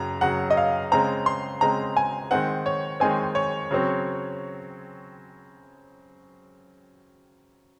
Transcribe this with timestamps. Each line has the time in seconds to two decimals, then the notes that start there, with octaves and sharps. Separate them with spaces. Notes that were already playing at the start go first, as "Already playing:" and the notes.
Already playing: F#2 C#3 F#3 A#5
0.21 F#2 C#3 F#3 F#5
0.50 D#5
0.57 F5
0.92 C#3 G#3 C4 A#5
1.26 C6
1.61 C#3 G#3 C4 A#5
1.97 G#5
2.31 D#3 G#3 C4 F#5
2.66 C#5
3.00 D#3 G#3 C4 G#5
3.35 C#5
3.71 C#3 F#3 C4